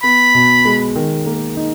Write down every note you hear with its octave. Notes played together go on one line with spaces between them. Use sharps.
B3 B5
B2
G#3
D#3
A#3
D#4